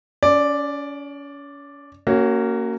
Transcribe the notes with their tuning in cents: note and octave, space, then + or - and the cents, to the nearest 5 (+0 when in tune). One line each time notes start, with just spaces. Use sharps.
C#4 +35 D5 +0
A#3 -20 C#4 +0 F#4 +20